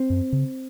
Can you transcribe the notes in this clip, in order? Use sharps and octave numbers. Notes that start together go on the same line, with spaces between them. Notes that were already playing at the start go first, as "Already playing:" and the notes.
Already playing: C4
F#2
C#3